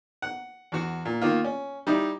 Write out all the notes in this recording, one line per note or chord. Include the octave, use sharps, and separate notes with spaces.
F#5
E2 F#4
A#2
D#3 A#3 F4
C#4
G3 D#4 E4